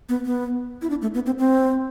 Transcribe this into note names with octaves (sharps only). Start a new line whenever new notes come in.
B3
B3
E4
D4
A3
B3
C4
C4